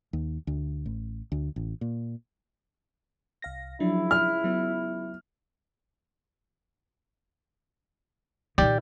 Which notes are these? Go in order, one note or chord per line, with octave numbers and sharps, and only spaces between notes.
D#2
D2
A1
D2
A1
A#2
C2 F5 A#6
C#2 F3 F#3 D4 E4
F6
F#3 B3
A#2 D#3 G4 D5